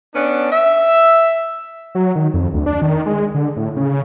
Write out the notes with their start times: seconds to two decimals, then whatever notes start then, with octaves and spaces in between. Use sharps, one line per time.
0.15 B3 C#4 D4
0.52 E5
1.95 F#3
2.16 D#3
2.34 F2
2.54 D2
2.66 D4
2.82 D#3
3.06 G#3
3.34 D3
3.57 A2
3.76 C#3